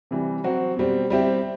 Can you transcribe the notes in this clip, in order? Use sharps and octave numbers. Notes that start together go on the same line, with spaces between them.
C3 E3 G3
F#3 C4 F#4
B2 G3 C4
G3 C4 E4 G4